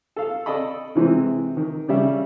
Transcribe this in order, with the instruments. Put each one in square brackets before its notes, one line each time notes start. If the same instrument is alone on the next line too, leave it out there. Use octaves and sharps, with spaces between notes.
[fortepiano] A4 F5
A4 D5 D#5 B5
C3 E3 G#3 C4
D#3
C#3 G3 E5